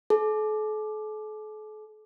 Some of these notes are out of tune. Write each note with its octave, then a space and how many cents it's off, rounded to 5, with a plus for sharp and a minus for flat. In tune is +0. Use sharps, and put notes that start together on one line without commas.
A4 -45